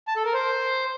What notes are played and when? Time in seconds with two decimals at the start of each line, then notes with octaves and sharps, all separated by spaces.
0.08 A5
0.16 A4
0.25 A#4
0.34 C5